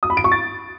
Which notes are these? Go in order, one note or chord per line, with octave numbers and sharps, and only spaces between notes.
D#6
B5
D7
C#6
A6